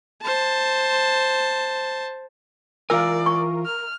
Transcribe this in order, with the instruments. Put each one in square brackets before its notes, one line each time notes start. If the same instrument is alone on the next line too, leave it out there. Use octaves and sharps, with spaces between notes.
[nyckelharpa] C5 A5
[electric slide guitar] E3 F4 G#5 [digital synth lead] A#4 [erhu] D5 [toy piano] F5 E6
[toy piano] C#6
[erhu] F6